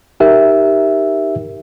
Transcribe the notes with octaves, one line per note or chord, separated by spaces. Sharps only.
D#4 G4 A#4 E5